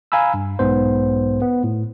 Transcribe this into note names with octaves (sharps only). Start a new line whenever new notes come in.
F5 G#5 A#5 B5 E6
G2
B1 G#2 B3 C5
B3
A2